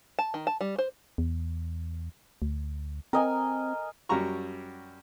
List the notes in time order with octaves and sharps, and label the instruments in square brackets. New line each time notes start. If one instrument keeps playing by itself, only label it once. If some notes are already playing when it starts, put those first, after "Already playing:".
[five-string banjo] A5
D#3
A5
G3
C5
[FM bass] E2
D2
[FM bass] C4 [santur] A#4 D#5 G#5
[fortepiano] F#2 G3 F#4 A#5 C#6